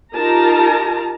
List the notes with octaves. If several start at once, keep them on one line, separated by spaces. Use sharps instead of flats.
D#4 F4 G4 A#4 A5 A#5